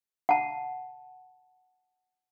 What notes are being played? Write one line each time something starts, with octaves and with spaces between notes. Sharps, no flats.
F#5 A5